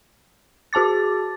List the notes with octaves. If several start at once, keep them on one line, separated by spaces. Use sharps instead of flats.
F#4 G#4 A5 D6 A6